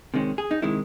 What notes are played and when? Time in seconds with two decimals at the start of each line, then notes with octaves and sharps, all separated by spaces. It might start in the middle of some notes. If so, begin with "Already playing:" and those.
0.14 C3 D#3 G#3 C#4
0.38 G#4
0.51 D#4
0.62 C3 D#3 G#3 E4